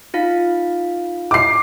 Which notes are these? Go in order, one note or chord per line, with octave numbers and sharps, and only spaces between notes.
D#4 F4 F5
D6 C7